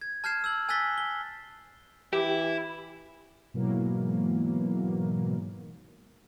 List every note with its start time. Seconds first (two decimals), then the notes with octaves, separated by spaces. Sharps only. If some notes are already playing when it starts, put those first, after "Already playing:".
0.01 G#6
0.24 A5 F6 G6 G#6 C7 E7
0.44 E6 G6 F#7
0.69 G#5 E6 F#6 A6 B6 G7
0.98 G7
2.13 E3 E4 G4
3.54 G#2 B2 E3 F#3 A#3